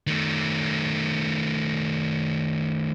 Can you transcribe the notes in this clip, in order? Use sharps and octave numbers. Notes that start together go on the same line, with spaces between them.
D#3 A3